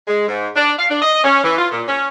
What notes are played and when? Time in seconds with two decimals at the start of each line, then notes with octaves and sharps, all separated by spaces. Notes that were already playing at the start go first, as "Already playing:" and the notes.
0.07 G#3
0.28 G#2
0.56 D4
0.79 F5
0.90 D4
1.02 D#5
1.24 C#4
1.44 E3
1.58 F4
1.72 A#2
1.89 C#4